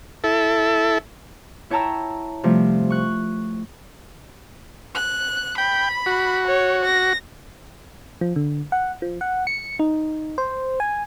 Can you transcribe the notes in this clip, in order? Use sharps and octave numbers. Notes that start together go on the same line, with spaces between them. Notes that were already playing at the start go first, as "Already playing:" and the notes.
E4 A4
E4 C#5 G5 A5 A#5 E6
C3 F3 G3 A3
C#6 F#6
F#6
G5 B5
F#4
C#5
A#6
F3
D3
F#5
F3
F#5
C#7
D#4
C5
G#5